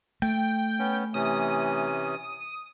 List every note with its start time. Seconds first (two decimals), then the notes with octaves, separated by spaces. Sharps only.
0.22 A3 G5
0.79 B3 C#4
1.14 C3 E3 C#4 D#6